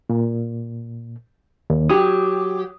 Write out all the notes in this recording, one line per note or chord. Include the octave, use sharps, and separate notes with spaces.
A#2
D#2
F#3 G4 D#6